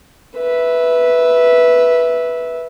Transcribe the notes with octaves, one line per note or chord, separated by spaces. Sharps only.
B4 E5